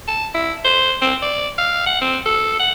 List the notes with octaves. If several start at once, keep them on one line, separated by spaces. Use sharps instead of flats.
A5
E4
C5
C4
D5
F5
F#5
C4
A4
F#5